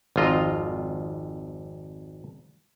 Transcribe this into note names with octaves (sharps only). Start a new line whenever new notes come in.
G#1 F2 F4 D#5 A#5